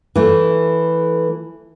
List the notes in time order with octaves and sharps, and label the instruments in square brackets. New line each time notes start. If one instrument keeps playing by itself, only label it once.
[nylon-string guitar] E3 A3